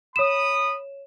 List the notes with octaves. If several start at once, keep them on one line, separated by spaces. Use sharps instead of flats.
C#5 B5 D#6 E7